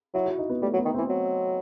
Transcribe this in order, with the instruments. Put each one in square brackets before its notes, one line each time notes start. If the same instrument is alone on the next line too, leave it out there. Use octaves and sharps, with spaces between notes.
[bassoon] F#3 [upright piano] E4
[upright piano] F#4
D#4
B3
[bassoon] G3 [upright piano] A3
[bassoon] F#3
[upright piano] B3
[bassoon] D#3
[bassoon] E3 [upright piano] C4
[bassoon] F#3